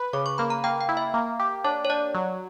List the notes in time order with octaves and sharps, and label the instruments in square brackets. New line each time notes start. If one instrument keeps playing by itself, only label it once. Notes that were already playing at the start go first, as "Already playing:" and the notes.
Already playing: [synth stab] B4
[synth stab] C#3 [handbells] D6
[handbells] C#6
[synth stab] A#3 [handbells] B5
[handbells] A#5
[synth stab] A#3 [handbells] G5
[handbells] G5
[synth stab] E4
[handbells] E5
[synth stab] A#3
G4
[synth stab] D4 [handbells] C#5
[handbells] C#5
[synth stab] D4 [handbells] D5
[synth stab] F#3